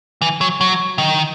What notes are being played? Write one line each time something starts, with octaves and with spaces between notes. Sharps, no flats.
E3
F#3
F#3
D#3